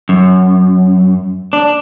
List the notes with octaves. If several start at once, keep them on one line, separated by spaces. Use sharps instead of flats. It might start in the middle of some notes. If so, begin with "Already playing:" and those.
F#2
D4